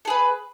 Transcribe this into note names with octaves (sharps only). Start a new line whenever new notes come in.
G#4 A4 B4